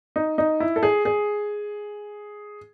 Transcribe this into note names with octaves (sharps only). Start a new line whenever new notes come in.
D#4
D#4
E4
A4
G#4
G#4